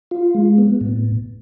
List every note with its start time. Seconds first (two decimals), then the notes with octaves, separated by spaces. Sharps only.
0.11 F4
0.35 G#3
0.58 B3
0.81 A2